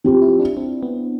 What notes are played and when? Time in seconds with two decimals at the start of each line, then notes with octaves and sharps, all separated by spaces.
0.04 F3 C4 G4
0.22 E4
0.40 D4
0.57 C4
0.83 B3